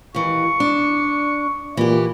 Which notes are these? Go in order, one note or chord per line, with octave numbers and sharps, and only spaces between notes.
D#2 E3 C#6
D4
A#2 E3 G4